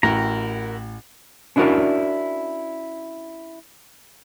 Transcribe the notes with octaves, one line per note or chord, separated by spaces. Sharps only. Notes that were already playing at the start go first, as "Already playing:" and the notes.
A1 E4 F#4 A#4 G5 A#5
C#4 D4 E4 F#4 A#4 D5